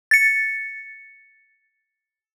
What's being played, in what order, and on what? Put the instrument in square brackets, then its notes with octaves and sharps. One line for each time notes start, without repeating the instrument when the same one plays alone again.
[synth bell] A6 C#7